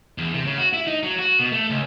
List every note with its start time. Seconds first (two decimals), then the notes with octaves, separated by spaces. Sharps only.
0.18 E2
0.34 C3
0.46 C#3
0.58 F#4
0.73 E4
0.87 D#4
1.03 F#3
1.19 F#4
1.39 B2
1.52 A3
1.70 C#2